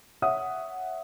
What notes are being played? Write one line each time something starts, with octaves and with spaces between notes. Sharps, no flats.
C#5 E5 F#5 D#6